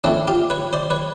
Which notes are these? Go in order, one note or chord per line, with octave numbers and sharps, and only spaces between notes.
A2 E3 A3 C4 D4
F4 G4
B4 C#5
C5 D5
B4 C#5